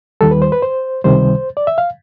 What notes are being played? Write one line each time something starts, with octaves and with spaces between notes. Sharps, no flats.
D#2 D#3 G3 A4
B4
C5
B4
C5
C#2 C3 D#3 G3 C5
D5
E5
F5